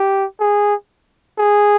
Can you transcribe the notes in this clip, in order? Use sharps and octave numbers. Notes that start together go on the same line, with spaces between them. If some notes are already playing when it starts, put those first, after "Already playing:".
Already playing: G4
G#4
G#4